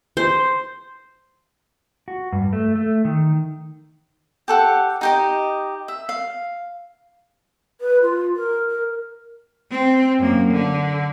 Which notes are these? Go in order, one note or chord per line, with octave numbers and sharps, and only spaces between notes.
C5
F#4
G2
A3
A3
D#3
G4 A4 F#5
D#4 G4 D#5
E5
F5
B4
F4
A#4
A#4
C4
F#2 A#3
D3